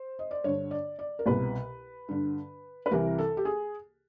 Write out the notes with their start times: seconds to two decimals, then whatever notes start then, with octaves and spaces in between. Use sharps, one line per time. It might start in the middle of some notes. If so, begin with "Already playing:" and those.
Already playing: C5
0.19 D#5
0.31 D5
0.44 G2 D3 C#5
0.71 D5
0.99 D5
1.19 A#4
1.26 C2 B2 B4
2.08 G2 D3
2.86 B4
2.91 C2 C3 E3 A#4
3.18 A4
3.37 G4
3.45 G#4